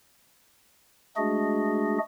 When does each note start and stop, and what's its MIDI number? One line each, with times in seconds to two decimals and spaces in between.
1.17 1.98 56
1.17 1.98 57
1.17 1.98 62
1.17 1.98 66
1.17 1.98 68
1.17 1.98 75